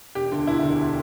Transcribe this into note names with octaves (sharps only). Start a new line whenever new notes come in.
E1 G4
D2 D3
E1 E4
D2 D3